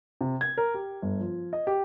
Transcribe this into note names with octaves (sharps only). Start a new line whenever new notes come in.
C3
G#6
A#4
G4
G1
F3
D#5
G4